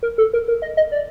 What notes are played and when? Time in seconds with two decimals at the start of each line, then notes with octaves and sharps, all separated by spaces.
0.03 A#4
0.18 A4
0.33 A#4
0.48 A#4
0.62 D#5
0.77 D#5
0.92 D5